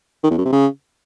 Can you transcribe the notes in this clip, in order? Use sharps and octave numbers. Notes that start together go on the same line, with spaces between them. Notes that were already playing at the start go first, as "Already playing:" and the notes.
D#3
E2
F#2
C3
C#3